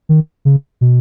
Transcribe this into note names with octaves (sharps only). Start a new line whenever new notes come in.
D#3
C#3
B2